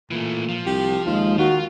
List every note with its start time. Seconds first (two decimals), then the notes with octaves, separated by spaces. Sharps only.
0.11 A#2 E3 A3
0.49 F3
0.66 C2 G4
1.06 D#2 G#3 F4
1.38 D#3 F4 F#4